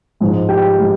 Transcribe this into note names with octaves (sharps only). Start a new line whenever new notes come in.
G#2 F3 G#3
G4 G5
F3 G#3